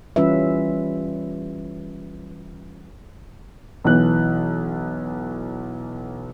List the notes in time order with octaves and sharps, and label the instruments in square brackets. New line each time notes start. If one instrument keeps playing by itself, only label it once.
[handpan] E3 G3 C#4 F4 B4 E5
[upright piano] B1 E3 F#6